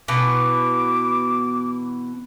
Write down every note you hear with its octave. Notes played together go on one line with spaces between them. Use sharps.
B2 E3 B3 D6